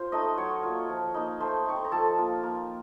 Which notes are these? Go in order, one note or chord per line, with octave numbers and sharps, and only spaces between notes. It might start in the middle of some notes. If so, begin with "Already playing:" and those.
Already playing: F4 C5 C6
A3 D#4 D#5 D#6
F#3 C#5 C#6
A#3 F4
F3
A#3 D#4
A3 C5 C6
C4 D#4 C#6
C6
A#5
F3 A4 A5
A#3 F4
A#3